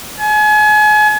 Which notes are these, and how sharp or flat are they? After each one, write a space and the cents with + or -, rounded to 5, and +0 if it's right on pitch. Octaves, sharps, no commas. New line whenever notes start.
G#5 +35